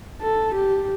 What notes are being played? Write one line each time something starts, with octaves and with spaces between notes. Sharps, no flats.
A4
G4